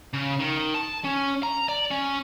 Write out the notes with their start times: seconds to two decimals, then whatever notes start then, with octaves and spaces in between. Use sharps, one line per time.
0.14 C#3
0.40 D#3
0.74 A5
1.04 C#4
1.43 A#5
1.68 D5
1.91 C#4